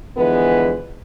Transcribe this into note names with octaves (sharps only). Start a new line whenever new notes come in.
D3 E3 F3 G#3 B3 B4